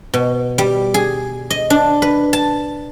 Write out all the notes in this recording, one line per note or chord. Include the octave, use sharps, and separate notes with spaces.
B2
G3
G#4
D#5
D4
B4
A5